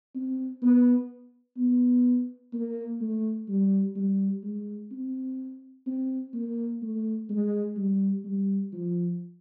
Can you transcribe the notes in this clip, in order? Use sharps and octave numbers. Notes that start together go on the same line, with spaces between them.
C4
B3
B3
A#3
A3
G3
G3
G#3
C4
C4
A#3
A3
G#3
G3
G3
F3